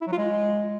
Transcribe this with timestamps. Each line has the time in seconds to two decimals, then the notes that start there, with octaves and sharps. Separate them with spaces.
0.02 E4
0.07 F#3
0.13 F4
0.18 G#3